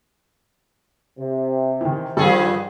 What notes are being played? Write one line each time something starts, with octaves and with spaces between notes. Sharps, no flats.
C3
D#3 E3
G2 D#3 F3 G#4 A4